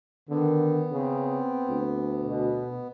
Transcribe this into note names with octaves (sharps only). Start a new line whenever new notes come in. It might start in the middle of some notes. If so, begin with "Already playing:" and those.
D3 D#3 B3
C#3 C4
D2
B2